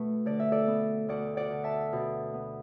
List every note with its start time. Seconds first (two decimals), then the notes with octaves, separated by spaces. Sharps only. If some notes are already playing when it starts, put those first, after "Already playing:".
Already playing: B2 A3 B4
0.26 D3 D5
0.40 E5
0.52 A4 D5
0.67 B3
1.08 D2 D5 F#5
1.37 D5 F#5
1.51 D3
1.64 E5 A5
1.93 B2
2.34 B3